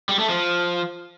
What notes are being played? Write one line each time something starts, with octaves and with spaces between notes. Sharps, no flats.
G3
A3
F3